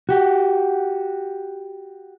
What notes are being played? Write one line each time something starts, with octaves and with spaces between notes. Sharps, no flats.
F#4 G4